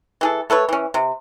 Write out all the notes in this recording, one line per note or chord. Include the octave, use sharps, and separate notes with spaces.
E3 G#4 A4
A3 A4 B4 C#5
E3 C#4
C3